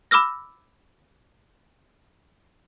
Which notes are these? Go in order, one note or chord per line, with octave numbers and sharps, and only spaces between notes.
B5 D6 E6 F6 A#6